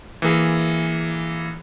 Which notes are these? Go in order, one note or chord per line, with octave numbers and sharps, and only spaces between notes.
E3 A#3 G#4